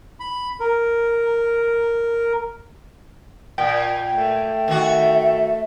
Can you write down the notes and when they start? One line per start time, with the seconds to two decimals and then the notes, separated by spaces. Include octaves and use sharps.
0.20 B5
0.60 A#4
3.58 A#2 G5
4.14 A3
4.68 D#3 F#4 E5